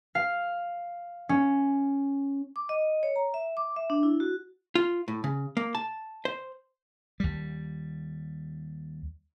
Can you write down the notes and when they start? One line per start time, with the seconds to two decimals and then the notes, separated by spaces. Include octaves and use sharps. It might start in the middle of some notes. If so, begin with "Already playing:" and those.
0.15 F5
1.29 C#4
2.56 D6
2.69 D#5
3.03 C#5
3.16 A#5
3.34 E5
3.57 D6
3.76 E5
3.90 D4
4.03 E4
4.20 F#4
4.75 F4
5.08 A2
5.24 C#3
5.57 A#3
5.75 A5
6.25 C5
7.20 D#2 G3